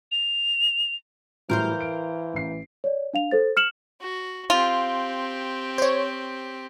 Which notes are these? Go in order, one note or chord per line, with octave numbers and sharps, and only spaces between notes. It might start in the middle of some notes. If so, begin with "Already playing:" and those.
F7
A2 E3 F#3 G3 A#4 C5 F5
D7
A1 C7
C#5 D5
D4 F5 F7
A4 C5 A6
F6 C#7 E7 F#7
F#4
C4 F4 G4
C5 C#5